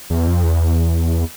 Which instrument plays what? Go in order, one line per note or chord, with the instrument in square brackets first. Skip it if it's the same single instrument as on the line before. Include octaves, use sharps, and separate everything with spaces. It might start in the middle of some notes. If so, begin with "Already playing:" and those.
[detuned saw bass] E2
F2
E2